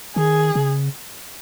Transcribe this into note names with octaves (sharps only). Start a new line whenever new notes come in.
D#3 G#4
C#3